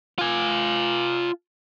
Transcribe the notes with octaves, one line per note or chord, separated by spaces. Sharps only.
F4 G#5